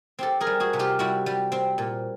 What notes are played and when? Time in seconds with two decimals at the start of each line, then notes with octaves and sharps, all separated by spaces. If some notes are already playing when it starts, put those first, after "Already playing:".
0.19 C4 G4 A4
0.41 G#4 A#4
0.47 G3
0.60 F#4 G#4
0.73 C3
0.79 F4 G4
0.99 G3 E4 F#4
1.26 G3
1.52 C4
1.78 A#2